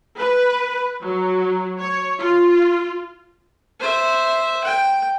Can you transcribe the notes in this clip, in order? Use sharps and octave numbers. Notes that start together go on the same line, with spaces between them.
B4
F#3
C#5
F4
C5 E5
G5